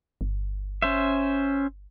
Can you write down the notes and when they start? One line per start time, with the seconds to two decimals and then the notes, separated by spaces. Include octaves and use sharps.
0.21 G1
0.82 C#4 C5 E5